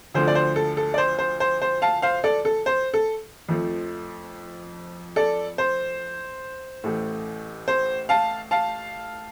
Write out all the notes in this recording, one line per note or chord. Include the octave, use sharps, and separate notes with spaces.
D2 D3 F3 A3 C5
D5
C5
A4
A4
D5
C5
C5
C5
C5
F5 A5
C5 F5
A4 D5
A4
C5
A4
F2 F3 A3
A4 D5
C5
A1 A2 A3
C5
F5 A5
F5 A5